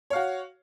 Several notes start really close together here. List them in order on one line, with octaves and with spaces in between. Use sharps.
C#5 F5 F#4